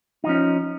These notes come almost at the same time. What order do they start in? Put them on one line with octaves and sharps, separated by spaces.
D#4 F3 C#4